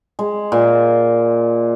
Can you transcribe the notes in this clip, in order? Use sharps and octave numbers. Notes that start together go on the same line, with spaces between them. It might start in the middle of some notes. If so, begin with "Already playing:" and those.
G#3
A#2